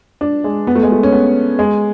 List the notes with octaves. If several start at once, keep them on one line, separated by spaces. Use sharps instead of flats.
D4
G#3
B3
A3
G#3
A3
C#4
B3
G#3